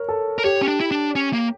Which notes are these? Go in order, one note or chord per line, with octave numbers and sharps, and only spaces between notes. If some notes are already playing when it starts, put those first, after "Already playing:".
Already playing: A#4 C#5
A4
A#4
G4 C#5
C#4
D4
E4
D4
C#4
A#3